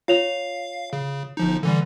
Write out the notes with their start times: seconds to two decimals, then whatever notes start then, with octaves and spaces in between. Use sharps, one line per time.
0.08 F4 C#5 F5 F7
0.93 C#3
1.37 G1 F3 D#4
1.63 D3 E3 G3